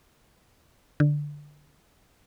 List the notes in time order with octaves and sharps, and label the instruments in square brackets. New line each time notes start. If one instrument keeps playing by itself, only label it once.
[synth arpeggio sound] D3